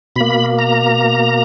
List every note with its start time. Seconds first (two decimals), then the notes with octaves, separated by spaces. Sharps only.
0.16 B2 A#3 B5
0.59 A#5